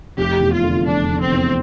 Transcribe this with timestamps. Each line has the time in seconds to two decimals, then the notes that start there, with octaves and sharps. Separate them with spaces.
0.17 F1 G4
0.41 E2
0.52 F4
0.63 D3
0.86 F1 D4
1.10 F1
1.21 C4
1.32 E2